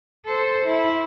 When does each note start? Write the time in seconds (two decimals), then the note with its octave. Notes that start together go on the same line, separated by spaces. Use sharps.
0.25 A4 C5
0.65 E4